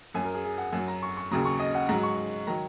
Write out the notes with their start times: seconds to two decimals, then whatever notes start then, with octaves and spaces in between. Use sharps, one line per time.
0.14 F#2 G#5
0.19 F#3
0.25 A#4
0.34 G#4
0.44 G#4
0.58 F#5
0.72 F#2 F#3 G#5
0.88 A#5
1.03 C#6
1.17 C#6
1.31 D#2 C#3 F#3 A#5
1.45 C#6
1.59 D#5
1.75 F#5
1.89 G#2 F#3 A#5
2.03 C#6
2.47 D#3 F#3 A#5